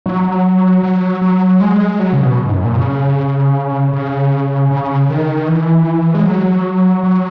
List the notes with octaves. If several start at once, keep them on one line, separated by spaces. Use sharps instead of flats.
F#3
F#3
F#3
G#3
F#3
C#3
B2
G#2
F#2
A#2
C#3
C#3
C#3
D#3
E3
G#3
F#3
F#3